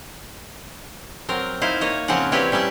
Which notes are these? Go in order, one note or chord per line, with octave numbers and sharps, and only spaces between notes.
F#3 C4 A#4
D#4 E4 C5 F5
A#3 C#5 D#5
C#3 F3 C4 C#4 A#4 F#5
C4 E4 G4 B4 C#5 D5
G3 C#4 D5 E5 A5